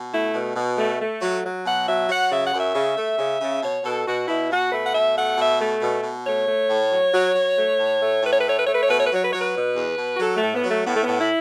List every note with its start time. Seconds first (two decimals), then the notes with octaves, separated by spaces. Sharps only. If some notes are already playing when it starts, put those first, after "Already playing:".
Already playing: B2
0.12 A3 E4
0.33 B2
0.55 B2
0.77 A3
1.00 A3
1.21 F#3
1.43 F#3
1.65 B2 F#5
1.86 F#3 E5
2.09 F#3 F#5
2.31 C#3 E5
2.44 F#5
2.53 F#2 E5
2.75 C#3
2.97 A3
3.18 C#3
3.41 C#3
3.62 B2 C#5
3.84 B2 A4
4.07 B2 F#4
4.28 B2 E4
4.51 B2 F#4
4.72 A3 B4
4.84 F#5
4.94 B2 E5
5.16 A3 F#5
5.37 B2 E5
5.60 A3
5.81 B2
6.03 B2
6.25 A3 C#5
6.47 A3
6.69 A2
6.91 F#3
7.14 F#3
7.35 F#3
7.56 A3
7.78 A2
8.01 A3
8.22 A2 B4
8.31 C#5
8.40 B4
8.45 A3 C#5
8.56 B4
8.64 A3 C#5
8.73 B4
8.81 C#5
8.89 B2 B4
8.97 C#5
9.05 B4
9.11 F#3 C#5
9.23 B4
9.31 F#3 C#5
9.39 B4
9.55 B2
9.76 E2
9.98 B2
10.14 F#4
10.20 F#3 A4
10.36 A3
10.42 A2
10.53 B3
10.63 F#3
10.69 A3
10.86 A2 B3
10.95 A3
11.02 B3
11.07 A2
11.18 E4